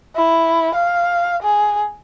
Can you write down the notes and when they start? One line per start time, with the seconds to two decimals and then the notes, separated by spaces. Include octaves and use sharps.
0.16 E4
0.75 F5
1.42 G#4